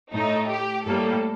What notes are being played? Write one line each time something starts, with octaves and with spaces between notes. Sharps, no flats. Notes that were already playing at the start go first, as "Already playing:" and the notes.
A2 A3 D#4
G4
A2 G3 A#3 A4